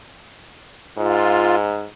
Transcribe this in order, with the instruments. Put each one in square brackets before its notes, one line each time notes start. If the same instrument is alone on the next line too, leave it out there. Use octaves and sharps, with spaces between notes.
[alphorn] G#2 [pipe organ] F4